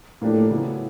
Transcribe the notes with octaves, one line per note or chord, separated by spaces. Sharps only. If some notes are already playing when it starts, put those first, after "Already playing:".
A2 F3 A#3 D4 G4
C#3 F#3 B3 E4